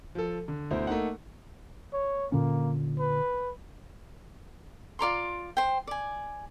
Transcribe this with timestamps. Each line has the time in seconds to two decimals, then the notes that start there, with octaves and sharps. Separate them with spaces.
0.15 F3 A4
0.48 D3
0.71 D2 B2 E4 C5
0.87 A3 A#3 D#4 F#5
1.93 C#5
2.32 A#2 D3 A#3 C#4
3.00 B4
4.99 F4 D5 A#5 C6
5.57 C5 G5
5.87 D5 G#5